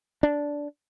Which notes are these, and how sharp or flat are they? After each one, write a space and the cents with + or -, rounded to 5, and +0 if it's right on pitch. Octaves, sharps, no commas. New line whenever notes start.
D4 -10